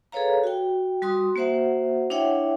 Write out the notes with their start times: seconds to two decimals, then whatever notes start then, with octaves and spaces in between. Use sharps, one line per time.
0.12 G#4 A4 B4 C#5 F5 A#5
0.44 F#4 G5
1.02 G3 F#4 C6 D#6
1.36 A#3 F#4 C5 E5 F#5
2.10 D4 E4 C#5 E5 F#5 G5